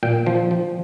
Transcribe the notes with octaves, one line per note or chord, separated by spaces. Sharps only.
A#2 G5
F3
F3